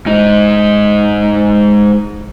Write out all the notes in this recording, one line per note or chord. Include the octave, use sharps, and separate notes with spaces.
G#2 D#4